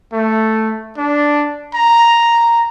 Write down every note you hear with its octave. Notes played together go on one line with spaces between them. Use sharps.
A3
D4
A#5